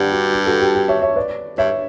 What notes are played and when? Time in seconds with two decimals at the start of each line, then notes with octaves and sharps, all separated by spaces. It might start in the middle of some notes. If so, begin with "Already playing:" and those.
Already playing: G2 G4 D5 F#5
0.12 F#4
0.33 G4
0.46 F#4 A4
0.60 G4
0.75 G4
0.88 C#5 E5
1.02 C#5 E5
1.16 B4 D5
1.58 G2 C#5 E5